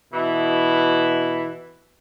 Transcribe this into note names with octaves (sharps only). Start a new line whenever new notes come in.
B2 E3 E4